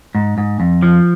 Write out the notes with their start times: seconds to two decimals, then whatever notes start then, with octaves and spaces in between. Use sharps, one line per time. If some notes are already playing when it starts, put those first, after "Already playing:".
0.15 G#2
0.38 G#2
0.60 F2
0.83 F3